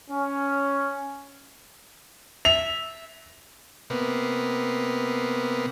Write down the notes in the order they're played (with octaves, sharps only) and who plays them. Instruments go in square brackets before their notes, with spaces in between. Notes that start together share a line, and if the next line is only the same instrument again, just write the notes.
[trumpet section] C#4
[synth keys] E5 [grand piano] F7
[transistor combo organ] C3 A#3 B3